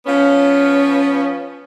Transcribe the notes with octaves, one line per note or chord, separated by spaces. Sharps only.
F3 B3 C#4